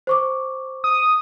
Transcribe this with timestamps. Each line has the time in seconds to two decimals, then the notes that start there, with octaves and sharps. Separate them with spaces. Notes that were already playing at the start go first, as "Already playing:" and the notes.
0.07 C5 C#6 D6
0.84 D#6